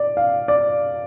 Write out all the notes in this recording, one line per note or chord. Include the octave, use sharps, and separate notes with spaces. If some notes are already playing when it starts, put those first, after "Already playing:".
Already playing: D5
F5
D5